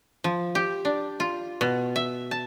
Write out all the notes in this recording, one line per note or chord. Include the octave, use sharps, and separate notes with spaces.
F3
G4
D4
F4
B2
E5
A5